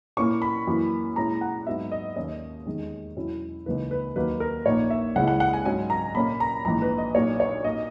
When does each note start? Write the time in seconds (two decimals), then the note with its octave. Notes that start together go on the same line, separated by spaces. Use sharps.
0.17 A#2 A#3 C#4 E4 C#6
0.42 B5
0.67 F#2 E3 A#3 E4
1.16 A#2 G#3 C#4 E4 A#5
1.41 F#5
1.67 G#2 F#3 B3 D#4 E5
1.92 D#5
2.16 D#2 D#3 A#3 C#4 D#5
2.66 E2 D#3 G#3 D#4
3.16 E2 B2 F#3 C#4 E4
3.66 C#2 C#3 E3 A#3 D#4 B4
3.91 B4
4.16 D#2 D#3 F#3 A#3 B4
4.40 A#4
4.66 A#1 A#2 A#3 D#4 C#5
4.90 E5
5.16 C#2 C#3 G#3 C#4 E4 F#5
5.28 F#5
5.40 F#5
5.53 G#5
5.65 G#2 F#3 C#4 G#5
5.90 A#5
6.15 A#2 A#3 C#4 B5
6.40 A#5
6.65 A#1 G#2 E3 A#5
6.82 B4
6.98 D#5
7.15 B1 A#2 A#3 D#4 C#5
7.40 C#5
7.64 A#2 A#3 D#4 D#5